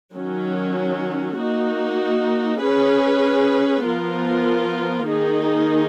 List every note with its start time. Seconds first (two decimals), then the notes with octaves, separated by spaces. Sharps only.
0.14 D#3 F#3 C#4
1.37 A#3 D#4 F#4
2.62 C#4 G#4 B4
3.85 F3 B3 F4 A#4
5.08 D#3 A#3 D#4 G#4